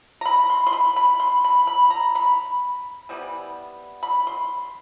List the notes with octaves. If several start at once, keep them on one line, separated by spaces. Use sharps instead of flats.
A#5
B5
C6
C6
B5
B5
C6
B5
B5
A#5
B5
C3 E3 G3 B3
B5
C6